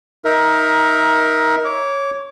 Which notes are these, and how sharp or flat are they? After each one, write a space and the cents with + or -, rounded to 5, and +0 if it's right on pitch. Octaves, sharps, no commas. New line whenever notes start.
D#4 +20 A#4 +15 E5 +0
C#5 -5 D6 -25